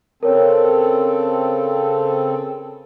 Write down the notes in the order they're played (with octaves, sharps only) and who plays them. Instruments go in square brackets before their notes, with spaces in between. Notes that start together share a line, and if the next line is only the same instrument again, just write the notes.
[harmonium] C#3 C4 A4 [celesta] A#4 C#5